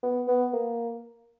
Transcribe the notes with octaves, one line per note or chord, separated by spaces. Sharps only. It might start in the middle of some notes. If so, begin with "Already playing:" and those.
B3
B3
A#3